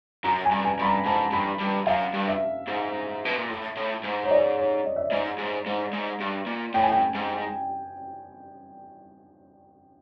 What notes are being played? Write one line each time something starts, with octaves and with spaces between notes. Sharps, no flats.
F#2 A#5
G#5
G2
G#5
G2 B5
A#5
G#2 A5
G2 B5
G2
F#2 F5
G2
E5
G#2
B2
A#2
A2
A2
G#2
C#5
D5
C#5
D#5
E5
G#2 D#5
G#2
G#2
G#2
G2
A#2
A2 G5
G#5
G5
G#2